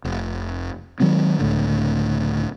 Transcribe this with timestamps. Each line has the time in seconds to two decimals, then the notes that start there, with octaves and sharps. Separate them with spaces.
0.04 F1
1.00 D#3 F#3 G#3 C4
1.39 C#2 A2 D3